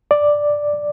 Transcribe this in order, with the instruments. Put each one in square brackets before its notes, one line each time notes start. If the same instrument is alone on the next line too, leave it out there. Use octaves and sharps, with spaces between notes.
[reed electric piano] D5